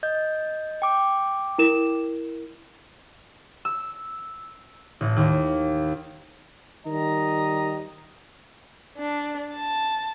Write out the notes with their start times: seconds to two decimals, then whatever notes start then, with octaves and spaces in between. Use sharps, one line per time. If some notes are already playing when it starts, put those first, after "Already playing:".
0.03 D#5 G6
0.82 G5 D6
1.58 E4 A#4 E7
3.65 E6
5.01 A1
5.16 D#2
6.86 D#3 G3 D#5 A#5
8.98 D4
9.54 A5